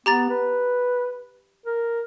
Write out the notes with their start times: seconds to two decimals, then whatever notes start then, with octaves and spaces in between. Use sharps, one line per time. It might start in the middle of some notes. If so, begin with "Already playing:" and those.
0.06 B3 G4 A#5 A6
0.30 B4
1.66 A#4